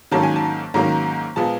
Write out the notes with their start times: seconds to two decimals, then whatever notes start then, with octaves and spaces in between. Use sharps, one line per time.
0.12 G#2 D#3 F#3 A#3 C#4 A5
0.23 G#5
0.36 A5
0.74 G#2 D#3 F#3 A#3 C#4 A#5
1.36 A#2 F3 G#3 B3 A5